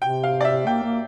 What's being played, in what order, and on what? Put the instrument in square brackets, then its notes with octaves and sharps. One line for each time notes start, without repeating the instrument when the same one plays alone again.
[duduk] C3 [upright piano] G5
[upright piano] F5
D5
E5
[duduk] A#3 [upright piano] G5
[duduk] A#3